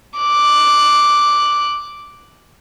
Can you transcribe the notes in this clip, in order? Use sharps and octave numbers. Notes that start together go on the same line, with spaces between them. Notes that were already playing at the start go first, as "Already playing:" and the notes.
D6 F#6